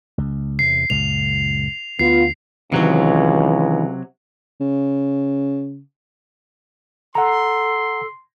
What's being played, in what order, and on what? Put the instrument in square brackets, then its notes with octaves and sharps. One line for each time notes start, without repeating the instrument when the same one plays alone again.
[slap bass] C#2
[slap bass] E2 C3 [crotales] C7
[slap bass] C#2 F#2 A#2 [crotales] F7
[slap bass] D2 [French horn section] B3 F4 [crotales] C7
[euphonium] C#2 [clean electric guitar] C3 F#3 [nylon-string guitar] D#3 E3
[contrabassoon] C#3
[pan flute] A4 [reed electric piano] F#5 A#5 [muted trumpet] C6